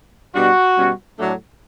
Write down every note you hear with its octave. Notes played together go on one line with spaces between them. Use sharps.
B2 G3 D4 F#4
B2 G3 C#4
A2 F#3 A3 D4